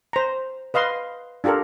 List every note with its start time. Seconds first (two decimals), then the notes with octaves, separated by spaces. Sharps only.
0.13 C5 A#5
0.74 B4 D#5 F5 C6
1.44 D4 F4 G4 A4 A#4